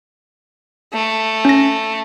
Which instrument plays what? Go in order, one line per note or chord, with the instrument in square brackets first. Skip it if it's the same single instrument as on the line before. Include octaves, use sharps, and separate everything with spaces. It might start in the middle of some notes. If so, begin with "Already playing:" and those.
[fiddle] A3
[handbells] C#4 A#6